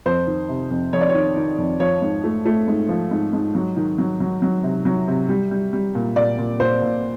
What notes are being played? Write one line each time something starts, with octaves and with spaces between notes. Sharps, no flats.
F2 C5
D#3
C3
F2
F2 C#5
D5
C#5
D#3
D#3
F2
F3 C#5
G#2
A3
A3
G#2
F3
G#2
G#2
F#3
D#3
F#3
F#3
F#3
C3
F#3
C3
G3
G3
G3
A#2
A#2 D5
A#2
A#2 C5
A#2